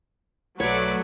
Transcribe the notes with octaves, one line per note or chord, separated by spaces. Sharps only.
B1 F#3 A3 B4 C#5 D5